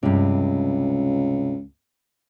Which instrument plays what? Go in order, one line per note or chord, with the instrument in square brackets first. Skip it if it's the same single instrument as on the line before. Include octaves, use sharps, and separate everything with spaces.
[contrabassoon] C#2 [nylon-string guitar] G2 C3